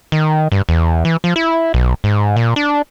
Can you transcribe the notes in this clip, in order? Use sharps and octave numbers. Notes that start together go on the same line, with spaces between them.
D#3
G2
E2
E3
F3
E4
B1
G#2
A#2
D4